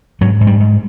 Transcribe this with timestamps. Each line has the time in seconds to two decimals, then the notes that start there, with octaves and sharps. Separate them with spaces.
0.21 G#2 F#3
0.41 G#2
0.47 G3
0.60 G#2